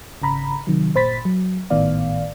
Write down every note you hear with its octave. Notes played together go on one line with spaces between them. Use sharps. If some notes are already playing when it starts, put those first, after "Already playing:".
G#1 C#3 A#5 B5
C3 D#3 F#3
G1 A#2 C5 B5 A6 B6
F#3
G#1 A2 D#3 B3 D5 F5